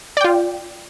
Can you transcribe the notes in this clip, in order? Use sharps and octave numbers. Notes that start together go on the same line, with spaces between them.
F4 D5 G5